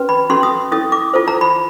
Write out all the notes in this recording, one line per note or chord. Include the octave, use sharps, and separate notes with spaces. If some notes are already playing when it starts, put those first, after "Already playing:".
Already playing: C#4 F#4 B4
B5
C#4 F#4 A4 C6
D#6
C#4 E4 A4 D#6
D6
F4 A4 C5
A#5
B5